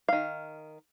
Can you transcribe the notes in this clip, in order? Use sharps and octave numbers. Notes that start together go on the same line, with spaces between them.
D#3 F5